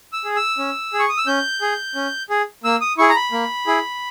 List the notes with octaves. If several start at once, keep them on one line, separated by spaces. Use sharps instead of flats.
E6
G#4
E6
C#4
G#4
C#6
D#6
E6
C#4 G6
G#4
C#4
G#4
A#3 E6
D#6
E4 G#4 C#6
A#5
B5
A#3
E4 G#4